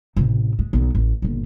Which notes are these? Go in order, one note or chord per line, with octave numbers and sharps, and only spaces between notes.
A1 C3
G#3
B1 B3
A1
G1 A#2